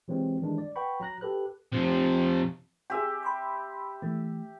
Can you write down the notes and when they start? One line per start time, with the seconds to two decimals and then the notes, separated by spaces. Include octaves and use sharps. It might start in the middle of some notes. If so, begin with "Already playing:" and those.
0.08 C3 E3 F#3 G#3 C4
0.42 D#3 E3 G3 G#3 D4
0.58 D5
0.76 B4 F#5 G5 B5 C#6
1.00 F#3 A#5 F#6 A#6
1.21 G4 A4 B4 F#6
1.72 C3 F3
2.90 G4 G#4 E5 G#5
3.23 B5 C6 D6
4.02 E3 A3